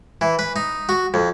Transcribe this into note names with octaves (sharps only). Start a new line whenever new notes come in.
E3
B4
D#4
F#4
F2